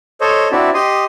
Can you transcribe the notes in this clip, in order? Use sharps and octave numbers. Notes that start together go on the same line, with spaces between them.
A4 C5 C#5 D#5
C4 D4 E4 F#4 D5 E5
G4 D#5 C6 D#6